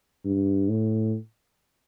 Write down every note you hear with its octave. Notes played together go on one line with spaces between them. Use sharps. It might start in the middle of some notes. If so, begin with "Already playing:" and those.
G2
A2